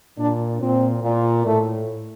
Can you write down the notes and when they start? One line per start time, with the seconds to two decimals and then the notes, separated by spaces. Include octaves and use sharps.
0.18 A#2 D4
0.61 A#2 C4
1.03 A#2
1.45 A2 A3